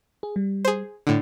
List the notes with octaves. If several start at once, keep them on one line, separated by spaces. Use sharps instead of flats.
G#4
G3
G#4 C5
A2 D3 D4